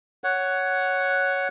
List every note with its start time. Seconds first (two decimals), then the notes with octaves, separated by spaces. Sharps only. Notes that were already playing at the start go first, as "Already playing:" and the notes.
0.24 C#5 F#5